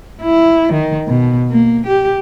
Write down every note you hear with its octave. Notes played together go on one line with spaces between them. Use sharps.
E4
D#3
B2
A#3
G4